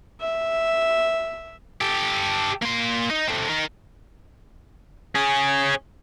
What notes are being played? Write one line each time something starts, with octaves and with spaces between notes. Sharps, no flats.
E5
G4 A4
A#3 C6
D#4
A3 C4
D#4 A#4
C#4 G#4